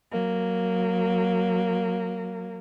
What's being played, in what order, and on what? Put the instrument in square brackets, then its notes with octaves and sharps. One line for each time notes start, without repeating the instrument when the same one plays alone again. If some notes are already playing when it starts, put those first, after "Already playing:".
[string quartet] F#3 A#3